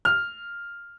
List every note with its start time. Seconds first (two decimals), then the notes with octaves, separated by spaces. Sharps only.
0.05 F6